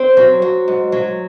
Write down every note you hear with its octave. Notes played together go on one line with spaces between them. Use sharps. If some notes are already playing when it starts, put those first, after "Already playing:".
Already playing: C4 C5
F#3
F#3
G#2
F#3